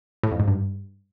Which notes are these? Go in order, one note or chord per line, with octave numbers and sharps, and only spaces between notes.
A2
F2
G#2
G2